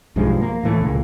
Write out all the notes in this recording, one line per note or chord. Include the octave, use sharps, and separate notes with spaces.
B1 G2 F3 G#3
A#3
A2 E3 A3
C#2 A#2 A#3